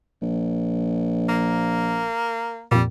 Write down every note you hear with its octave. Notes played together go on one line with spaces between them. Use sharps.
A#1
A#3
F2 A#2 G3